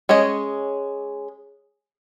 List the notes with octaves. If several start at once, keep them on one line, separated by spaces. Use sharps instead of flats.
G#3 C#4 C#5 D#5